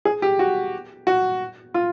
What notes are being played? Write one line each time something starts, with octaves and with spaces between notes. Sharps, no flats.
G#4
G4
F#4
F#4
F4